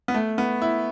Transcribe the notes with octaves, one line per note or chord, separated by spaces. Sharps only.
B3
A3
B3
E4